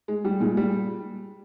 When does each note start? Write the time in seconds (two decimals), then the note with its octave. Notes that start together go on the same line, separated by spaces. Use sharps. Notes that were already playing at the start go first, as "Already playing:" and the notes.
0.08 G#3
0.25 G3
0.40 A#2 G#3
0.57 G3